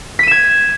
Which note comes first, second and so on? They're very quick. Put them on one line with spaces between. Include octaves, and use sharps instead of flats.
B6 D#7 E7 G#6